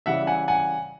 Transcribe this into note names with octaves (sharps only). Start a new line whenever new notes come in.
C#3 E3 G3 E5 F#5
F#5 G#5
F#5 G#5